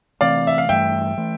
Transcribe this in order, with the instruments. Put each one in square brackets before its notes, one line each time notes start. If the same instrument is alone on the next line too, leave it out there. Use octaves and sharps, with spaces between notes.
[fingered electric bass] C3 E3 A3 C4 [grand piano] D5 F5
[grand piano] E5
F5
[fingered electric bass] G2 E3 A3 [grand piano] E5 G5
[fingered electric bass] E3 A3